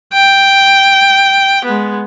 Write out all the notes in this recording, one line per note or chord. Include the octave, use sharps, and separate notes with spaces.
G5
G#3 B3